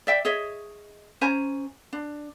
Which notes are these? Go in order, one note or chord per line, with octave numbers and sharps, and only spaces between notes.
D5 E5 G5
G#4 C#5 D#5 E5
C#4 C5 G#5 A#5
D4